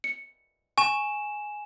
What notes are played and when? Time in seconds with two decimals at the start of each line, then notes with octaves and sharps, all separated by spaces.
0.04 C#7
0.78 G#5 C#6 E7